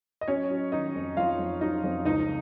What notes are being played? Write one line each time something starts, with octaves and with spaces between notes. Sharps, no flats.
D#5
F#3 C#4 C#5
F#3
D#3 D#4 D#5
F2
F2 F4 F5
F2
F#3 D#4 D#5
F2
C#2 D#4 D#5